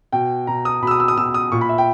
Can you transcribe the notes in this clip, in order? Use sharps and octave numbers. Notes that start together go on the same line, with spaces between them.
B2 G5
B2 A#5
D#6
B2 B5
E6
D#6
E6
D#6
B2 E6
D#6
A#2 C#6
B5
E5
G5